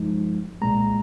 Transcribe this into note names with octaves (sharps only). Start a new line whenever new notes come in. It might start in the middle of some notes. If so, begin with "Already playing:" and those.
Already playing: G2 F3 G#3 D#4
C2 A#2 G#3 A#5